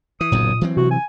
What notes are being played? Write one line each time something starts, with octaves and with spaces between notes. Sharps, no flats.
E3 D#6
F#1 B1 F#2 A#2
E3 F#3 C4
C3 F#4
G#5